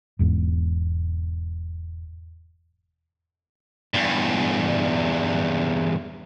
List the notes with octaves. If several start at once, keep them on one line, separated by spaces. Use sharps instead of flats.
E1 E2 G#2
E2 G2